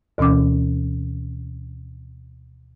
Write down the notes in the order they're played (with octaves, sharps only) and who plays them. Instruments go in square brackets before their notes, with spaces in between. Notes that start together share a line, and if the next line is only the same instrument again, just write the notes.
[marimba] D2 B2 E3 C#4 D6